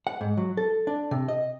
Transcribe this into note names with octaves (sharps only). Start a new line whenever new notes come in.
F#5
G#2
F#3
A4
D4
C3
D#5